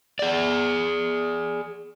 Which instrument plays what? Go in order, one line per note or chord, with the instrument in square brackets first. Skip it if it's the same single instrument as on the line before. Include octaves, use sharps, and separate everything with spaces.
[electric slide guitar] G#4 D5